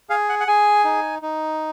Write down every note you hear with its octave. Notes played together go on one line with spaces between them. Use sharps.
G#4 F5
F#5
F#5
G#4 G#5
D#4
D#4